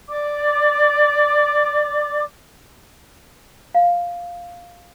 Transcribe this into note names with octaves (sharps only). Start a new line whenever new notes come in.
D5 D6
F5